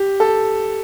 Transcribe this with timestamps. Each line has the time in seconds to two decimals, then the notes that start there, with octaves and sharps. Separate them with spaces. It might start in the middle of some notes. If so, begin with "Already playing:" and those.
Already playing: G4
0.20 A4